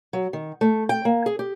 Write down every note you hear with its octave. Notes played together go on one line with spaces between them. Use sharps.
F#3
D#3
A3
G5
A#3
G#4
G4